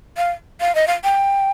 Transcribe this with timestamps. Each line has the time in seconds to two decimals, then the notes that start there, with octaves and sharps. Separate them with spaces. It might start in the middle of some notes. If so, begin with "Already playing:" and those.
0.17 F5
0.61 F5
0.75 D#5
0.87 F5
1.04 G5